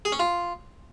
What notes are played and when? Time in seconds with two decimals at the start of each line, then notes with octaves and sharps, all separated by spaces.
0.05 G#4
0.12 C#4
0.20 F4